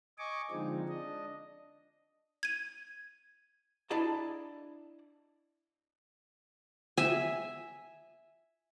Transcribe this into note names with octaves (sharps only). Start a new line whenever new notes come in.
D#5 G#5 C#6 D6
D3 F3 G#3 C4 D#4
D4 D#5
G#6 D#7
D4 E4 D5 D#5 A5 A#5
E5 G#5